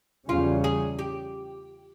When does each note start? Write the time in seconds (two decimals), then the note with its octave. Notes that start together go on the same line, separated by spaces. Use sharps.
0.29 E2 C#3 G3 C#4 F4
0.64 G#4
0.99 G4